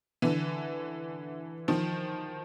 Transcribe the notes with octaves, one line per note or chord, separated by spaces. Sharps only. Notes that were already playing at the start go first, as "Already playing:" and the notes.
D3 E3
D#3 F3